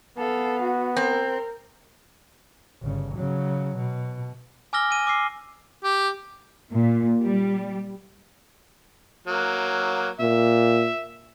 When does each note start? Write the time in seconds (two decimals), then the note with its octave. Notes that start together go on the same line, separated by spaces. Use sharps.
0.18 B3 A4 F5
0.61 F#4
0.96 C4 A#4
2.82 G1 C#3
3.14 C#3 F#3
3.76 B2
4.73 G#5 D6 E6 F6 A#6 G7
4.91 G#5 D#7
5.07 D6 E6 C7
5.84 G4
6.72 A#2
7.24 G3
9.27 F#3 A#3
10.20 A#2 E5